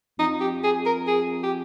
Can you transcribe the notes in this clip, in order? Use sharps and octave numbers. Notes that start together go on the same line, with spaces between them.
F2 D#4
G4
G#4
A#4
G#4
G4